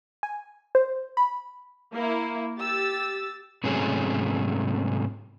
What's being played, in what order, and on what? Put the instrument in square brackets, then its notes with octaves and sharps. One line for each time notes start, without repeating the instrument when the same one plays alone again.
[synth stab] G#5
C5
B5
[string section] A#3 E4
G4 E6 A6
[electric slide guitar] G#2 C3 F#3 A3 C#4 G#4